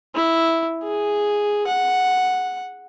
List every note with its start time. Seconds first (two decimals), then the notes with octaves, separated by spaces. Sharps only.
0.15 E4
0.84 G#4
1.67 F#5